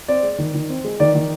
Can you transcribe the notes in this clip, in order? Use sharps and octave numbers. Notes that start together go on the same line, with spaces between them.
C4 D5
G#3
D#3
D#3
C4
G#3
D#3 D5
D#3